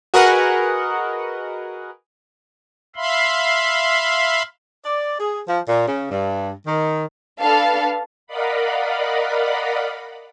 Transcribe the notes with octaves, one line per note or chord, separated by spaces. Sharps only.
F#4 G#4 A#4 B4 D#5 F#5
E5 F5 B5 C6
D5
G#4
F3
A#2
C#3
G2
D#3
D4 A4 B4 F5 A5
A#4 D5 D#5 F5 F#5 B5